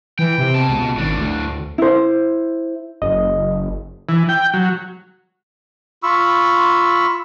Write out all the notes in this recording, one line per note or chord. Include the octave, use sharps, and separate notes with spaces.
E3 G5
C3
B2 A5
C#2
G#1 A2 D4
D2
E4 C5
F#1 D#5
E3
G5
F#3
F4 B5 C#6 E6